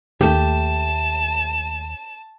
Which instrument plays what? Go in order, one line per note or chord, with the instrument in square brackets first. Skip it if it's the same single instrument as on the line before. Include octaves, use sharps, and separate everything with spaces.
[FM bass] D#2 [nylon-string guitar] A3 G4 [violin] A5 E7